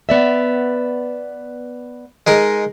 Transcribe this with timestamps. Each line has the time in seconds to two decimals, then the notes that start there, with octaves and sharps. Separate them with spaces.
0.09 B3 D5 E5
2.27 G#3 D#4 A#4